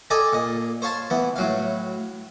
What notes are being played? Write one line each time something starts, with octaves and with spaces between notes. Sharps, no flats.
A4 D5 D#5 G5 G#5
A#2 D#5
C5 C#5 F5 A5 C6
E3 B3
A2 F#3 F5